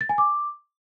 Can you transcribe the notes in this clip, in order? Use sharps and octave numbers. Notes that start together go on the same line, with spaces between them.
A6
G#5
D6